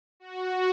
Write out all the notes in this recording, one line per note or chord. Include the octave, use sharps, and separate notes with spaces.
F#4